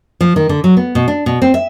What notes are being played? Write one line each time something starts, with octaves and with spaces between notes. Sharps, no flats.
F3
D#3
D3
F#3
B3
B2
D4
B2
C4
E5